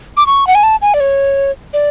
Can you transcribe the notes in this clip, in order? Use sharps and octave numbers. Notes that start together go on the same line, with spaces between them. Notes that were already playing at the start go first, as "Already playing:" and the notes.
D6
C#6
F#5
G#5
A5
G#5
D5
C#5
D5